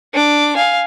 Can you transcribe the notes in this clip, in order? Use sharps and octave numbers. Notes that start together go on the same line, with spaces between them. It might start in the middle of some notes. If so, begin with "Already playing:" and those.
D4 D6
F5 G#5